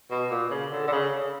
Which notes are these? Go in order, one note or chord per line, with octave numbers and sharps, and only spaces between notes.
B2
A#2
C#3
D3
D3
C#3